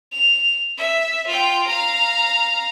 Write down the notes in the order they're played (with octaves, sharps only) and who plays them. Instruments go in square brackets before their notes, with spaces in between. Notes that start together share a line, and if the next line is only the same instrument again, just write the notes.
[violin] F7
E5
F4 G5
F5 A#5